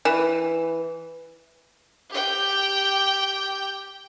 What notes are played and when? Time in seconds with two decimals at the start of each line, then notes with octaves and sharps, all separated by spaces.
0.05 E3
2.10 G4 G5